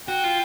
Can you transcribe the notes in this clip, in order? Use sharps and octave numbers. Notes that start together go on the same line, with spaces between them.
F#4 G5
F4